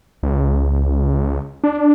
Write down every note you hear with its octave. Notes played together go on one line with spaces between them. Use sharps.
C#2
D4